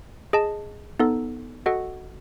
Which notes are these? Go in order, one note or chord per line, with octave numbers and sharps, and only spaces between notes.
G#4 D#5 A5
B3 D#4 A4
F#4 A4 D#5 F#5